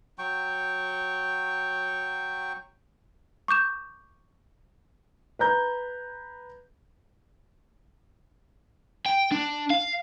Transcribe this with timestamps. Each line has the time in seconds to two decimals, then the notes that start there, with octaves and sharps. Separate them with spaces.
0.19 F#3 G5 C#6
3.48 C#6 D6 G6 E7
5.39 B4 A#5 G6
9.06 G5
9.31 D4
9.70 F5